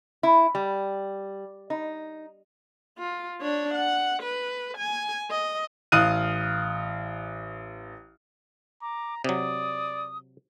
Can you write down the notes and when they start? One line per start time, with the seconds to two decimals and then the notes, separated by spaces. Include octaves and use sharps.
0.23 E4
0.55 G3
1.70 D#4
2.98 F4
3.41 D4 C#5
3.74 F#5
4.23 B4
4.77 G#5
5.30 D#5
5.92 A1 F5 D#6 F6 F#6 D#7
8.82 A#5 D6
9.24 C3 F#3 D5 D#6